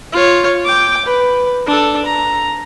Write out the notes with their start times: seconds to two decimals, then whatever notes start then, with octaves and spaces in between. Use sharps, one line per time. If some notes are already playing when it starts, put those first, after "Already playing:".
0.13 F4 C#5
0.65 G5 D6
1.05 B4
1.66 D4 A4
2.06 A#5